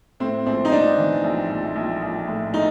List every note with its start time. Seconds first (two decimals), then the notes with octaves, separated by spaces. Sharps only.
0.20 A2 C4
0.46 A#1 C4
0.65 D#4
0.72 A#1 D4
0.98 E3
1.24 A#1
1.50 A#1
1.76 A#1
2.01 A#1
2.27 A2
2.53 A2 D#4